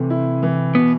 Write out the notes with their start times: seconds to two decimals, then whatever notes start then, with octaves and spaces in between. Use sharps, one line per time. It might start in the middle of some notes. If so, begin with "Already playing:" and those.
Already playing: C3 E3 A3
0.10 E4
0.43 E3
0.75 B2 B3